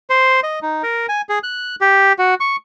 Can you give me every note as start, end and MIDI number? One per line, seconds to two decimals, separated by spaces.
0.10 0.40 72
0.43 0.59 75
0.62 0.82 63
0.83 1.06 70
1.09 1.22 80
1.29 1.39 68
1.43 1.76 90
1.81 2.13 67
2.19 2.34 66
2.40 2.56 85